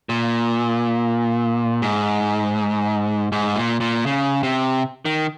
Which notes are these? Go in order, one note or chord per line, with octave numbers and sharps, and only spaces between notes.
A#2
G#2
G#2
A#2
A#2
C#3
C3
D#3